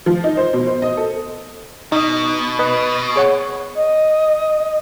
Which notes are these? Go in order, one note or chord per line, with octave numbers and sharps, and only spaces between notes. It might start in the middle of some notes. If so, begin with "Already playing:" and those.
F3
D#4
C5
B2
C5
D#5
A4
B2 D#4 D#5
B4 D#5
G#4 C#5 F#5
D#5